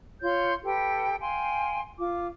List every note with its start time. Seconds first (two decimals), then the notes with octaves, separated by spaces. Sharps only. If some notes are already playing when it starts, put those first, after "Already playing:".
0.22 F4 C#5 C6 G6
0.64 G4 A4 B4 G5
1.20 F5 G5 G#5 C6
1.98 F4 D6